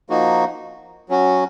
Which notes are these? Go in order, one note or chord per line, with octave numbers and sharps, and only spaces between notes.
F3 A#3 D#4 F#4
F#3 C#4 F#4